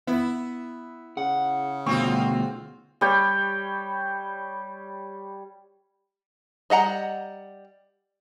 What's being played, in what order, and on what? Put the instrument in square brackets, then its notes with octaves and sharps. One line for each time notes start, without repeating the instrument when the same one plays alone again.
[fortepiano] B3 [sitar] E4
[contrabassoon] C#3 [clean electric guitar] F#5
[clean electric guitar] D2 B2 [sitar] C4 F4 F#4 [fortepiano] C#6
[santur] G3 C#5 G5 B5
[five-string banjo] G3 D#5 F#5 A#5